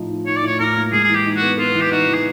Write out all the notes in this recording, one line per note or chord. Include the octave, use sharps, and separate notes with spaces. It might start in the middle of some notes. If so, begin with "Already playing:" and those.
Already playing: A2 F3 D#4
D#4
D#4 C#5
D5
A2 C#5
A2 A#4
A#3
G#3 G#4
E3 G#4
G4
D#4
F#4
B3
B3 F4
E3
G4
D#4 F#4
E3
G#4